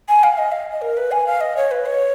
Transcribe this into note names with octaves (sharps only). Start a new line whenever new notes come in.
G#5
F5
D#5
F5
D#5
A#4
B4
G#5
F5
D#5
C#5
B4
C#5